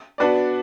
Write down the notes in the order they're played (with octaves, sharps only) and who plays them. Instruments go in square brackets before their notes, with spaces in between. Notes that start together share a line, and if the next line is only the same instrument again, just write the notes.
[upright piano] B3 D4 F#4 B4 D5